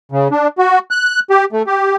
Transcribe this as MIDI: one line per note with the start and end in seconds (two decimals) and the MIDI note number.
0.12 0.28 49
0.31 0.48 62
0.58 0.79 66
0.91 1.20 90
1.30 1.45 67
1.53 1.62 57
1.67 1.96 67